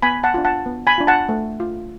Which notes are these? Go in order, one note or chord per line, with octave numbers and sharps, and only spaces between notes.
B3 G#5 B5
F#5 A5
D4 F4
F#5 A5
B3
G#5 B5
D4 F4
F#5 A5
A3
F4